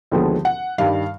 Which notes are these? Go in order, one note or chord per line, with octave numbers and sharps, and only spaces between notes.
D#2 D3 F3 G#3 B3
F#5
G2 D#3 G3 F5